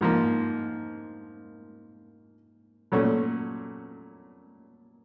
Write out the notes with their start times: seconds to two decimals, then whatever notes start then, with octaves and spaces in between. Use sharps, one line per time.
0.01 G#2 F3 A#3
2.92 A#2 F#3 A3 C#4